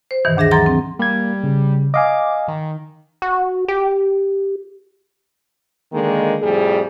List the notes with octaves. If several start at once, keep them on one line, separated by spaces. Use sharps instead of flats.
C5
G2 B2 D#3 E3
D2 D4 G#4 E5 A#6
E3 F#3 A#5 C6 A6
C4
G3 A#3 G#6
C#3
D#5 F5 G#5 D6
D#3
F#4
G4
D3 D#3 G#3 A#3
F2 A2 G3 G#4